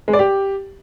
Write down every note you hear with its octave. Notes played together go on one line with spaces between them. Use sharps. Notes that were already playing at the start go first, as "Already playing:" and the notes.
G#3
D5
G4